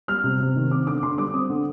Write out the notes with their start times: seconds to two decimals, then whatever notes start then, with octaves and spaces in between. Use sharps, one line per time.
0.08 G3 F6
0.24 C3
0.40 C3
0.56 D#3
0.71 C4 D6
0.87 D3 D6
1.03 D3 C6
1.18 G3 D6
1.34 C4 D#6
1.50 D3